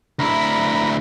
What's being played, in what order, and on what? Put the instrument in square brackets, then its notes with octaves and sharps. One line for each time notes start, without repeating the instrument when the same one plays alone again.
[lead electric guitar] D2 E4 [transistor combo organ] A#5 B5